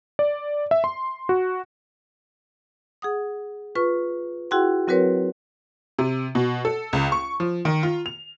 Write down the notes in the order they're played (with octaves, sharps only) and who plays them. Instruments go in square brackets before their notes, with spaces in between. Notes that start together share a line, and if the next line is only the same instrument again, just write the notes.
[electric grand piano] D5
E5
C6
F#4
[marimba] G#4 F#5 D#6
F4 B4 C#6
E4 F#4 G#4 F#5 G5 C6
F#3 C4 F#4 A#4 B4 C#5
[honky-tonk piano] C3
B2
A4
C#2
C#6
F3
D#3
F4
F7